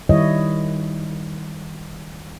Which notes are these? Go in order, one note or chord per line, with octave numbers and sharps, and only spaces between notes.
D#3 G3 E4 C#5 D#5